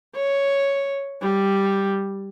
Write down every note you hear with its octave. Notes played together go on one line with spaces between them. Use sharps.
C#5
G3